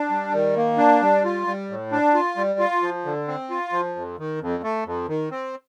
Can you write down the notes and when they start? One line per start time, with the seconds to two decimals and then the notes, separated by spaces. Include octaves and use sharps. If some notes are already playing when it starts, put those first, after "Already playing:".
Already playing: D4
0.10 G3
0.33 D#3
0.56 A#3
0.78 D4
1.02 G3
1.24 F4
1.47 G3
1.70 A2
1.92 D4
2.14 F4
2.37 G3
2.59 F4
2.82 F3
3.05 D3
3.28 C4
3.50 F4
3.72 F3
3.95 F2
4.19 D#3
4.41 F2
4.63 A3
4.86 F2
5.08 D#3
5.31 C4